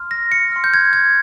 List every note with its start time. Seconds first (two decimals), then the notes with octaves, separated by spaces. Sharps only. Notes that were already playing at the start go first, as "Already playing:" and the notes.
Already playing: C6 F6
0.11 A#6
0.32 C#7
0.52 C6 F6
0.64 G6
0.74 G#6
0.93 G#6